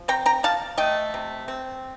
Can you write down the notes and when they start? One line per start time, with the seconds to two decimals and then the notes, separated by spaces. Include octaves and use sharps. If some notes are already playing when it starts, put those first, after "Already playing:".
Already playing: F3
0.08 C4 G5 A#5
0.26 G5 A#5
0.43 F3 F5 A5
0.78 A3 D#5 G5
1.14 C3
1.48 C4